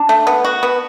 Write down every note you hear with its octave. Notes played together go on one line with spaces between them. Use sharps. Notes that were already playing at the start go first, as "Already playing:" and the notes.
Already playing: D4
A3
B3
F#4
B3